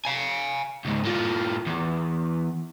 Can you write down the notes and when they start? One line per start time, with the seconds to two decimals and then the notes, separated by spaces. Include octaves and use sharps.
0.05 F5 G#5
0.85 C#2 G#2
1.05 A2 F4
1.67 E2